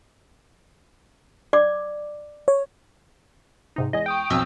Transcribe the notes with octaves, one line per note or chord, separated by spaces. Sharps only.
D5 D6
C#5
G#2 C3 D#4
E2 G#3 D#5
G5 C#6 D#6 G6
B1 F2 F3 G5 G#5 E6